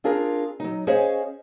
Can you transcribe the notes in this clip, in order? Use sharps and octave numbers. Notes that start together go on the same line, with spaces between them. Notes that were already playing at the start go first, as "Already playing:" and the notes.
C4 D4 F4 G#4 A#4
F#3 D#4
C#4 G#4 C5 C#5 D#5 F5